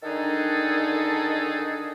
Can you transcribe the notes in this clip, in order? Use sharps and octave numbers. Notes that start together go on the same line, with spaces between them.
D3 D#3 D4 D#4 G#4 A4